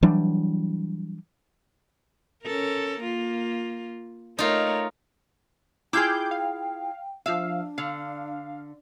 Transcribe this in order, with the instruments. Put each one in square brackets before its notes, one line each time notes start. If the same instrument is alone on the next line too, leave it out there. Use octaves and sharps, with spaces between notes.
[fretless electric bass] E3 F#3 G3 D4
[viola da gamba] C#4 A4 A#4
A#3 F4
[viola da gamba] A3 A#4 C#5 [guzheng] D#4 F4
[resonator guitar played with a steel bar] E4 F4 G#4 [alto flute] G5 [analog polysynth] D6 G6
[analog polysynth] F5
[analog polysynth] F3 F5 [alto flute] D4 [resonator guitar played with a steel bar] E5
[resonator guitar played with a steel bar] D3 [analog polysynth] F5